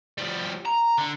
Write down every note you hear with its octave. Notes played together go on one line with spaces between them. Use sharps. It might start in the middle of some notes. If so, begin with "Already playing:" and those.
F3 G3
A#5
D3